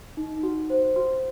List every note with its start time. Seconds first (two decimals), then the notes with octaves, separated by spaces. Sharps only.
0.17 D#4
0.43 F#4
0.70 C5
0.96 F#4